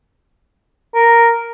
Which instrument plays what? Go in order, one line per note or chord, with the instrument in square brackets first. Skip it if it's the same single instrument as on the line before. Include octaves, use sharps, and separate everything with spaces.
[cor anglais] A#4